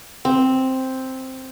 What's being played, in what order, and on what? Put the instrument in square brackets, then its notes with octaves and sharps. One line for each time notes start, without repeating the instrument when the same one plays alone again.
[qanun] C4